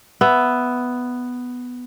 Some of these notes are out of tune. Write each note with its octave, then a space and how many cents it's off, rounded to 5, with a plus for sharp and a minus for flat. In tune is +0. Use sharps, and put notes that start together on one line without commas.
B3 +5 E5 +5